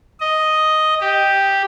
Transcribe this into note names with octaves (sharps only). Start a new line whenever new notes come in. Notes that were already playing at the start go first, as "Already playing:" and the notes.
D#5
G4